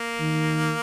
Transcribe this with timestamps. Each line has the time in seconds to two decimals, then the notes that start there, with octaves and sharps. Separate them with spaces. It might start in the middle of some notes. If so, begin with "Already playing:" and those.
Already playing: A#3
0.20 D#3